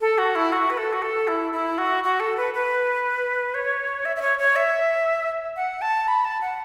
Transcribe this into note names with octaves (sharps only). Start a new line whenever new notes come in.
A4
F#4
E4
F#4
B4
A4
F#4
A4
E4
E4
F#4
F#4
A4
B4
B4
C#5
E5
E5
C#5
C#5
E5
F#5
A5
B5
A5
F#5